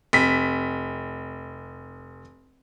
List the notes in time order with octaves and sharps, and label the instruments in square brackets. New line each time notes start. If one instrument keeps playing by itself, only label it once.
[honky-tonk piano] F1 B6